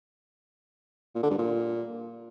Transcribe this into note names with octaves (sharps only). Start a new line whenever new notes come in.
A#2
D3
G2
A#2